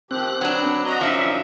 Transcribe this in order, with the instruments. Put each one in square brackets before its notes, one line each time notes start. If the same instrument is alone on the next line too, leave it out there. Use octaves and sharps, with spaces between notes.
[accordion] D#3 F3 G4 [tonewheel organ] C4 F#6
[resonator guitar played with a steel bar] F#3 D4 [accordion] B4
[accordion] F#4 A#5 [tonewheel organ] D#5
[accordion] F#2 [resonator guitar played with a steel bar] F3 D4 D#4 [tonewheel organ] E5